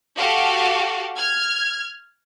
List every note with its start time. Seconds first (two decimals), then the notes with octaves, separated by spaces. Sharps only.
0.17 F#4 G4 A4 F5 F#5
1.16 F6 G#6